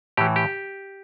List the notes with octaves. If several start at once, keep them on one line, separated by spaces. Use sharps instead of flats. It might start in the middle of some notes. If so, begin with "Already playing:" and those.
A2 E3 G4
G4